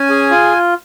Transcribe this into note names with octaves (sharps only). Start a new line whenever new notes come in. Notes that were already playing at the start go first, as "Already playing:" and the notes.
Already playing: C#4 G#5
G#4
F4